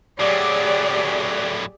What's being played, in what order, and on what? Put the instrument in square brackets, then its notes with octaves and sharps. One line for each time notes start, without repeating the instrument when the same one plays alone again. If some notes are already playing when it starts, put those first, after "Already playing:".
[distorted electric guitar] A2 F#3 [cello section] G4 G#4 D5